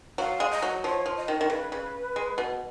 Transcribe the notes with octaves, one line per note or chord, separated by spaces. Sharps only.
F#3 F5
G#3
D#5
F#3
F3 C#5
F3
D#5
D#3
D#3
C#3 B4
C#3
G#3
B2